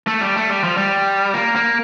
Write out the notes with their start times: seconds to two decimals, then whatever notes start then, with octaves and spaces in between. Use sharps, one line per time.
0.07 A3
0.21 G3
0.35 A3
0.50 G3
0.64 F3
0.77 G3
1.34 A#3
1.56 A#3